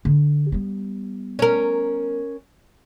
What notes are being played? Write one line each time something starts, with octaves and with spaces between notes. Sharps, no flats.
D3
G3 B3
C#4 A#4